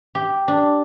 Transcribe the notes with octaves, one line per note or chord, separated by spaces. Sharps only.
G4
D4